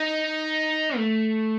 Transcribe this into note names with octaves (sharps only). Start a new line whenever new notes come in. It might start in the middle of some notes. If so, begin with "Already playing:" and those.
Already playing: D#4
A3